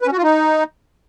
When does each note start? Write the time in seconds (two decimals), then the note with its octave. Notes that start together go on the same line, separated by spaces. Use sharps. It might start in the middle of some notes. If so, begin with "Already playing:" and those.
0.01 B4
0.07 C#4
0.12 F#4
0.18 F4
0.23 D#4